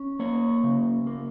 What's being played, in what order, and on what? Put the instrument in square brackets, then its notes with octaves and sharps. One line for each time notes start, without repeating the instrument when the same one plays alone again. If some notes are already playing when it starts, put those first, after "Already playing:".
Already playing: [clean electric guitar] C#4
A#3 C#5
C#3
A#3